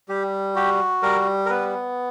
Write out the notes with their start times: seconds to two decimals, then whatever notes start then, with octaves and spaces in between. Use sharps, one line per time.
0.09 G3 G4
0.55 F#4 G4
1.03 G3 A#4
1.46 A#4
1.50 B3 B4